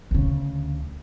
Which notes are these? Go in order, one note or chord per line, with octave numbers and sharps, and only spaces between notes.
D2 C#3